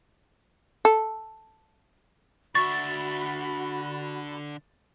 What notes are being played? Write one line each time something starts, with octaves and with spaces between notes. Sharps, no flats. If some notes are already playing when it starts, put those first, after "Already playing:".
A4
D3 F#4 E5 B5 C#6 A6